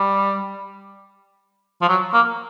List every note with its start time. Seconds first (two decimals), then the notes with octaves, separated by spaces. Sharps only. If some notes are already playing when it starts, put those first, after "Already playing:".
Already playing: G3
1.82 F3
1.89 F#3
2.13 A#3